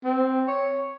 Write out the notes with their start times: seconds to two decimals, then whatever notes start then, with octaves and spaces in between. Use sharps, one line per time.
0.04 C4
0.48 C#5